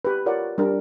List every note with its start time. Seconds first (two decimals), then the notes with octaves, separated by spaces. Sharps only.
0.05 G4 B4
0.26 F4 A#4 C#5 D5 F#5
0.58 G3 D4 A#4